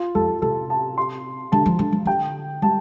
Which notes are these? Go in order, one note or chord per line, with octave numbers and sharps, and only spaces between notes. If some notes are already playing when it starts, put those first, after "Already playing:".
Already playing: F4
F2 A4
C3 A4
A5
C6
D3 A5
F3
D3
F3
D3 G5
G3 A5